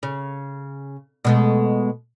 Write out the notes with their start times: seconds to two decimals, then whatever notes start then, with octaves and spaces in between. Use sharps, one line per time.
0.03 C#3
1.25 B2 G#3 A3